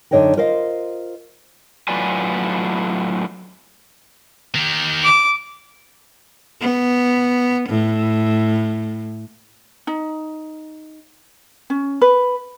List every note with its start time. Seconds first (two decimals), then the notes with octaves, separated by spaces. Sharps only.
0.11 F#2 D3 D#4 C#5 D#5 G5
0.37 F4 A#4 C5 D#5 F5
1.88 A2 F#3 F4 B4 D5 G#5
4.55 D#3 G4
5.04 D6
6.61 B3
7.69 A2
9.87 D#4
11.70 C#4
12.02 B4